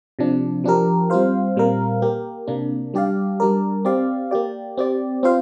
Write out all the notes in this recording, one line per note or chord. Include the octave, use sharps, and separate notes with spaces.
C3 F3 D4
F3 D4 G4 A#4
G3 C4 F4 C5 F5
A#2 G3 C4 A#4 F5
A#3 G4 A#4
C3 A#3 D4
G3 D4 G4 D5 F5
G3 D4 A#4 D5
C4 G4 D5 F5
A#3 G4 D5
C4 G4 D5
C4 F4 C5 F5